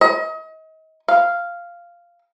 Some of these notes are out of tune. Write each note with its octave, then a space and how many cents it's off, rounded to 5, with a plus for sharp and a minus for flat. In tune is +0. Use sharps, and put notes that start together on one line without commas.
D#5 +35
F5 -5